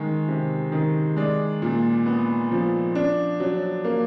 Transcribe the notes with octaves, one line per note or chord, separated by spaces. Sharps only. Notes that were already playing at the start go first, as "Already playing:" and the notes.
Already playing: D#3 G#3
C3
D#3
G#3 D5
A#2
B3
F3
D4
F#3
A#3